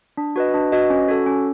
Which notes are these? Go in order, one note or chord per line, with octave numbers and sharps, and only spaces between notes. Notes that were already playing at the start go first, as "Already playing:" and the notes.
D4
F#4 B4 D#5
D4
F#4 B4 D#5
C#4
F#4 A4
C#4